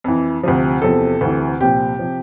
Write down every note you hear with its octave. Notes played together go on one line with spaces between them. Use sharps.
F2 E3
D2 C3 F3
E2 C3 F3 A4
D2 C3 E3
C2 A#2 F3 G4
C3 F3